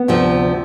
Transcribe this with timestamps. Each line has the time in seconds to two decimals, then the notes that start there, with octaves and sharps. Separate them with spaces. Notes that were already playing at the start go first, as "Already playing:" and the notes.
Already playing: B3
0.08 D2 C3 F3